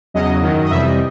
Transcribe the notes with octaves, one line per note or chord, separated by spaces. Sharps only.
E2 C#3 F#3 D#5
F#2 D#3 F#3
D#5
F2 C3 E3 G3 E5
D#5